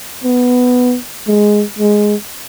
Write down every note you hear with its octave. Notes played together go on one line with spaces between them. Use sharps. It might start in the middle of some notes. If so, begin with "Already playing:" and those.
B3
G#3
G#3